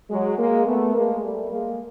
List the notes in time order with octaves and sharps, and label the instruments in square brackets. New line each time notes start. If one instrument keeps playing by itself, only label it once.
[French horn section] F#3 G#3
G#3 A#3
A3 B3
G#3 A#3
G3 A3
G#3 A#3